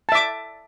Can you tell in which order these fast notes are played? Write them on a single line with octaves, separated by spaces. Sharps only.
A5 E5 D6